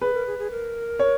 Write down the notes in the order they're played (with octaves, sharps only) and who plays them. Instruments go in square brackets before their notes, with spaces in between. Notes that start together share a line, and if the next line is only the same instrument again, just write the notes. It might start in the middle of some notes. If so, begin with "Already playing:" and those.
[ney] G#4 [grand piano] B4
[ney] A#4
G#4
G#4
A#4
[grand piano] C#5